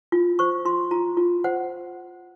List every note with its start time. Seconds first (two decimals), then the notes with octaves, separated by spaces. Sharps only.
0.12 F4
0.39 C5 C#6
0.65 F4 C6
0.91 F4 A#5
1.17 F4
1.44 C5 F#5